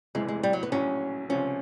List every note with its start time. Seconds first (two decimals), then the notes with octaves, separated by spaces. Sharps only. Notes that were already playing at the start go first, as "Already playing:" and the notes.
0.15 F1 E2 C3 E3 G#3
0.28 G#3
0.43 G3
0.53 F#3
0.63 B3
0.72 A#1 A2 F#3 C#4
1.29 C#2 C3 F3 C#4